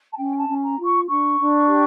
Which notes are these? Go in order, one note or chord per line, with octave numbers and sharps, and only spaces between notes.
A5
C#4 G5
A5
C#4
A#5
F4
C#6
D4 C#6
D4
G4